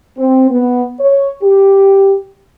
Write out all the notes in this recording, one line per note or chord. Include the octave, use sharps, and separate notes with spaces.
C4
B3
C#5
G4